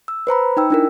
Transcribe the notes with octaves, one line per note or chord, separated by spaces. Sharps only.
E6
B4 C5 A#5 B5
D#4 G5 E6
D4 E4 A#4